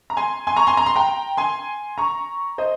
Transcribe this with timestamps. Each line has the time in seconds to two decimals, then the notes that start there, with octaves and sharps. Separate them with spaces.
0.10 A#5
0.17 G#5 C6
0.47 G#5 C6
0.57 A#5 C#6
0.67 G#5 C6
0.77 A#5
0.86 C6
0.96 G5 A#5
1.37 G#5 C6
1.98 A#5 C#6
2.58 C5 D#5